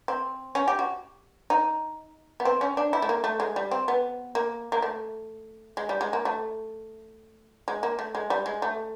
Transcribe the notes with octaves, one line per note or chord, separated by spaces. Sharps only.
C4
C#4
G4
F#4
D#4
B3
C4
C#4
D4
E4
A3
A#3
A3
G#3
G3
C4
B3
A#3
A#3
A3
G#3
G3
G#3
A#3
A3
G#3
A#3
A3
G#3
G3
G#3
A3